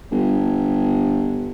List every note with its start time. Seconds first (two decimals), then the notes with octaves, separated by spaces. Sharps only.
0.12 G1